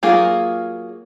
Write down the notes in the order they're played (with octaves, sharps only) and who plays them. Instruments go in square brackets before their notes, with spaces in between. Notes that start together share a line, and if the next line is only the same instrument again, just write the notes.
[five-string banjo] F#3 A#3 F4 G#4